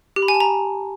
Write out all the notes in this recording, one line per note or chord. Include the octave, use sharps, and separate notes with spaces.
G4
B5
G#5
A5
A#5